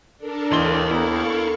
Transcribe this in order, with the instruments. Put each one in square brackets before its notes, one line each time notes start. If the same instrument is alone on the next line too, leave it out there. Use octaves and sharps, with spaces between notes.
[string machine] D4 A4 A#4
[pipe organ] D#2 [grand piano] E3 C6 G7 [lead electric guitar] C#5 D#5
[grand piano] B3 A#5 [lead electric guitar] E4 [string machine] A4 F5 C#6